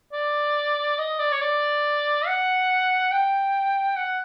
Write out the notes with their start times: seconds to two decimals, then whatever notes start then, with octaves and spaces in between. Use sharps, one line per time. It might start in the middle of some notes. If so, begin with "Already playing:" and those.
0.12 D5
0.98 D#5
1.19 D5
1.32 C#5
1.41 D5
2.27 F#5
3.12 G5
3.96 F#5